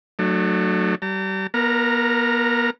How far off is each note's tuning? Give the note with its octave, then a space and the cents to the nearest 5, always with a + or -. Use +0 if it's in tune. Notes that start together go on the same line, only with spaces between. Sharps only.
F#3 +0 A3 +0 D4 +45
G3 -35 A#5 -45
B3 -40 A#4 +0 A#5 -15